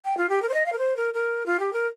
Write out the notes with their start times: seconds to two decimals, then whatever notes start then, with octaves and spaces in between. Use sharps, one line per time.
0.04 G5
0.17 F4
0.29 G4
0.42 A#4
0.48 C5
0.53 D#5
0.65 F5
0.72 A#4
0.78 C5
0.96 A#4
1.13 A#4
1.45 F4
1.59 G4
1.72 A#4